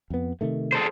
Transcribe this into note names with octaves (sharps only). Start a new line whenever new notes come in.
F2 B3
C3 D#3 A3
G#4 A4 C5